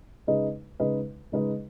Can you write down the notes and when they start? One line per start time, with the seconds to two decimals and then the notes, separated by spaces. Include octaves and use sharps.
0.27 C#3 G#3 D#4 B4 D#5
0.80 C#3 G#3 D#4 B4 D#5
1.32 C#3 G#3 D#4 B4 D#5